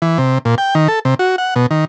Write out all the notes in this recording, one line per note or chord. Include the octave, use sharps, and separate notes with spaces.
E3
C3
A#2
G5
D#3
A4
C3
F#4
F#5
B2
D#3